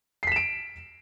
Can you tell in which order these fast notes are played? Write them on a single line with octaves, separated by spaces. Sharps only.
C7 B6 E7 D7